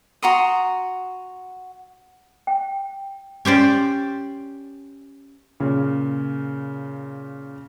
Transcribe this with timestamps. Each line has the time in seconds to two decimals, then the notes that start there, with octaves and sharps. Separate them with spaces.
0.22 F#4 A#5 C6 D#6
2.47 G5
3.45 C#4 G4 C5 D5
5.60 A#2 C#3